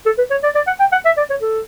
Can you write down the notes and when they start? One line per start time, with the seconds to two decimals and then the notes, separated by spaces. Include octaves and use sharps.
0.06 A4
0.18 B4
0.31 C#5
0.43 D5
0.55 D5
0.67 F#5
0.80 G5
0.92 F#5
1.05 E5
1.17 D5
1.30 C#5
1.42 A4